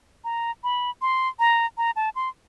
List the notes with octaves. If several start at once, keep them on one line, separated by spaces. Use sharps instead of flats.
A#5
B5
C6
A#5
A#5
A5
C6